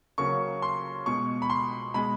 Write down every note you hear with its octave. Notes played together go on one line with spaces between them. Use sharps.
C#3 F#3 A#3 C#6
C6
B2 G#3 C#6
B5
C6
B2 G#3 B5